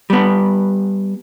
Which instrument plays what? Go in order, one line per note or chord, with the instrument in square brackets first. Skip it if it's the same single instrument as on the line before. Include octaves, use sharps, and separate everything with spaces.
[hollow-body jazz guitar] G3 B3